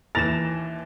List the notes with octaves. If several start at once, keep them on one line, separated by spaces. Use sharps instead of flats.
D#2 E3 A6 A#6 E7 F7